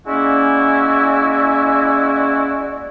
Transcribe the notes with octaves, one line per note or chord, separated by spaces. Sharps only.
G#3 A#3 C#4 E4 F#4 D5